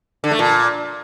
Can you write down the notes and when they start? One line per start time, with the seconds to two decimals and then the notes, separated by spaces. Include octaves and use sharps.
0.24 D3
0.31 A3
0.39 A#2